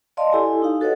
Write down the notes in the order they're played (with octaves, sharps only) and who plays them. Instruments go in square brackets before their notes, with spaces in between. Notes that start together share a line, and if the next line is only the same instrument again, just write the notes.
[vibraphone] D5 D#5 F5 A5 C6
E4 G4 A4 G#5
D#4 G4 F5
F#4 A4 B4 C#5 D#5 F#5